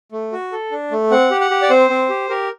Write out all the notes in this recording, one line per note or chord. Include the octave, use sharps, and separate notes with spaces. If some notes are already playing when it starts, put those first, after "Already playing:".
A3
F#4
A4
D4
A3
C4 F#5
G4
F#5
G4
D5
C4 C5
C4
G4
G4 A#4